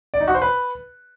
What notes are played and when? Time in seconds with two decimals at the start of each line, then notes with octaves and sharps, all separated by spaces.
0.14 D5
0.21 D#4
0.28 F#4
0.35 C5
0.42 B4